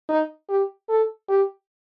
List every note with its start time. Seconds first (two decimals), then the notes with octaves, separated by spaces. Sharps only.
0.09 D#4
0.49 G4
0.89 A4
1.29 G4